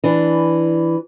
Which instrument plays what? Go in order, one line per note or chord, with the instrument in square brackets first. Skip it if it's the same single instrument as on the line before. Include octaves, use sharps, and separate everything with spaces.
[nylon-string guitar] E3 D4